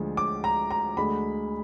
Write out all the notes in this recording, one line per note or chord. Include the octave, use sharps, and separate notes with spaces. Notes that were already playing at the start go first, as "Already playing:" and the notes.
Already playing: D2 D3 F3 G#3
D6
A#5
A#5
D2 D3 G#3 B5